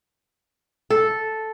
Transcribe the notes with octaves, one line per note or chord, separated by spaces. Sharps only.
A4